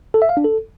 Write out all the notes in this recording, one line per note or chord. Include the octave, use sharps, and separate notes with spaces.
A4
E5
F5
D4
A4